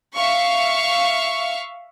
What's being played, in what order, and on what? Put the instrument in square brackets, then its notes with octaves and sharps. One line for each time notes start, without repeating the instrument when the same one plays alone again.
[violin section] E5 F5 C#6